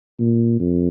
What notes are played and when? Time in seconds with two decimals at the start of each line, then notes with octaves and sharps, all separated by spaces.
0.19 A#2
0.60 F2